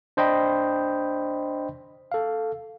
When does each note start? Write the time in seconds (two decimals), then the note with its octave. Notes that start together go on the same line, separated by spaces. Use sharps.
0.17 D4 C5 D#5 G5 B5
2.12 A4 F5